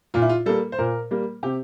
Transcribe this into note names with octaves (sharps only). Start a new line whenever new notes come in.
A#2 F4
E4
F4
G3 A#3 A4
C5
A#2 A#4
G3 A#3
C3 G4